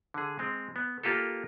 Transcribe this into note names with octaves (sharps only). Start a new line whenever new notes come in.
D3 G#4
G#3 C4
B3
A#3 F4 G4 A4